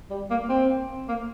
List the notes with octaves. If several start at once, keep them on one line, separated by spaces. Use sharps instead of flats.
G3
A#3
C4
A#3